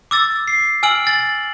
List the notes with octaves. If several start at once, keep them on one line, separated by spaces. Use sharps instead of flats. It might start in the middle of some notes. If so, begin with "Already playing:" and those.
D6 E6 A6
C7
G#5 E6 F6 D7 F#7
A6 F#7